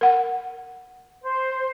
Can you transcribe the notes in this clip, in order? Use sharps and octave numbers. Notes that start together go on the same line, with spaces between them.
A#4 F#5
C5